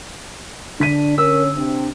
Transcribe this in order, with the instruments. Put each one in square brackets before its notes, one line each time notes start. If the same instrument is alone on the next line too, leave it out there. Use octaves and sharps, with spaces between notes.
[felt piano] D3 B6 D#7 [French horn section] D4
[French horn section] C#4 C#5 [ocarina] A#4 [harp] E6
[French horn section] C3 C4 [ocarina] D4